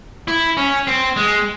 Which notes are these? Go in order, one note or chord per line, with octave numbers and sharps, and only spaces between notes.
E4
C#4
C4
G#3